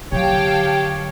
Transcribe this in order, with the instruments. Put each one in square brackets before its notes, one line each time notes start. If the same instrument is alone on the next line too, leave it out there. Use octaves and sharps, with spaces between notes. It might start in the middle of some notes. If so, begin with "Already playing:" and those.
[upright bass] D3 F#3 [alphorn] G4 [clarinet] C#5 [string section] F5 G5 A5